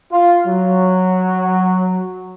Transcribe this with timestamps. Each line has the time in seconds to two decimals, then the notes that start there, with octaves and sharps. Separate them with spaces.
0.12 F4
0.46 F#3